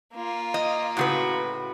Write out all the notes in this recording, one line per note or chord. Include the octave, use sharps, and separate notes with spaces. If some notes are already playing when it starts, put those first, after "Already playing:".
A#3 F4
D#5
A2 C#3 F#4 B4